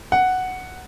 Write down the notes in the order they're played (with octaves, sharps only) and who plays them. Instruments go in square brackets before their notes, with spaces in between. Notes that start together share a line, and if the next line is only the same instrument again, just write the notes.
[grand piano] F#5